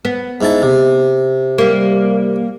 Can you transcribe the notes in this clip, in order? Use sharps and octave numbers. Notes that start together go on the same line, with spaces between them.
B3
G#2 E4 A5
C3
G3 A#3